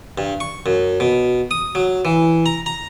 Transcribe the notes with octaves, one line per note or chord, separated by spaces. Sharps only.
G2
C#6
F#2
B2
D#6
F#3
E3
A#5
A#5